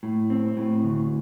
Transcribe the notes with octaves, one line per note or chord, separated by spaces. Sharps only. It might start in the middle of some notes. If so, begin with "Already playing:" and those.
A2
C4
A2
D2